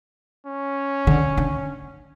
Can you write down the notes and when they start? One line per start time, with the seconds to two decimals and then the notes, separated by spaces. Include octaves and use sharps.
0.47 C#4
1.07 D3
1.37 D3